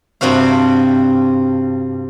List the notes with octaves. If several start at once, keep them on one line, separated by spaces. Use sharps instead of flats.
G2 C3 C4 F#4 F5